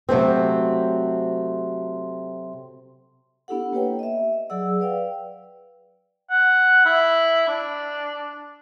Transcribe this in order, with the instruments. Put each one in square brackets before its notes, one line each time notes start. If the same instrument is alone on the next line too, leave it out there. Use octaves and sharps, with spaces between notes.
[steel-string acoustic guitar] C3 F#3 A3 C4
[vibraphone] B3 D4 E4 G4 A4 F#5
A#3 G4 B4 C#5 G5
D#5 E5
F#3 G#4 D5 F#5 E6
B4 D5 F5 G5
[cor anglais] F#5
E4
D4